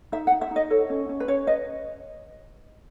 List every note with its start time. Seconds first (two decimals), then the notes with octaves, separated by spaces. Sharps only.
0.12 D#4 E5
0.27 F#5
0.32 D#4
0.41 E5
0.51 D#4
0.56 D#5
0.70 A4 C#5
0.90 C#4
1.09 C#4
1.20 B4
1.28 C#4 C#5
1.47 B4 D#5